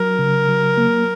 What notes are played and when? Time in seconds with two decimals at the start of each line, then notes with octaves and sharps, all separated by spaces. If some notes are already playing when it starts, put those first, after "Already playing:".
Already playing: F#3 A#4
0.19 C#3
0.49 F#3
0.77 A#3